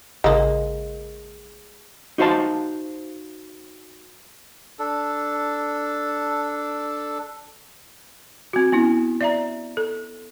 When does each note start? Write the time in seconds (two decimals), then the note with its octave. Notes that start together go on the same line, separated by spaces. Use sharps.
0.24 A1 C#3 G#3 A#3 D#5
2.18 D#4 F#4 C5 F5 A5
4.79 D4 A4
8.53 C4 F#4
8.72 B3 C#4 E4
9.21 D5 E5 A#5
9.77 A4